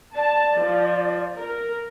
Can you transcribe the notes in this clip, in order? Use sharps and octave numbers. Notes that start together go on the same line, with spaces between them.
D5 A5
F3
A#4